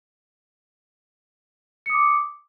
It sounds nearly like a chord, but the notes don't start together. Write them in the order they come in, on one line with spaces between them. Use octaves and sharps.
C#7 D#6 D6